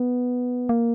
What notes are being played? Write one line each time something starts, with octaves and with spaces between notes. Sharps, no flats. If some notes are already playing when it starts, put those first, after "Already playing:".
Already playing: B3
A#3